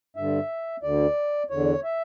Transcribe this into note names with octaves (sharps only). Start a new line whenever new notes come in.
G2 D3 E5
D2 D3 D5
E2 D3 C#5
E5